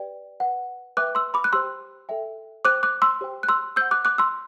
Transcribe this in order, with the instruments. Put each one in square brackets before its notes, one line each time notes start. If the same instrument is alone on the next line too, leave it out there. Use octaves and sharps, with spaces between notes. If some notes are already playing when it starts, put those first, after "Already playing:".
Already playing: [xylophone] G4 B4 D5 G5
B4 F#5
B4 E5 G5 D6 F#6
C6 E6
B5 D6
F#6
G4 C5 G5 C6 E6
A4 E5 G5
C5 G5 D6 F#6
D6 F#6
C6 E6
G4 C5 G5
F#6
C6 E6
C5 F#5 E6 G6
D6 F#6
D6 F#6
C6 E6